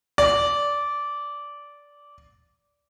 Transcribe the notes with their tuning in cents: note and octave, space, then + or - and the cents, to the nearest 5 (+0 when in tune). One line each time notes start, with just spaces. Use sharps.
D5 -15